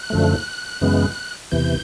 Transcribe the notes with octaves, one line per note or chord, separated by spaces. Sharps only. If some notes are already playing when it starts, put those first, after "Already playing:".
Already playing: F#6
F#2 D3 F3 A3
F#2 C#3 E3 G#3 B3
E2 C3 E3 G6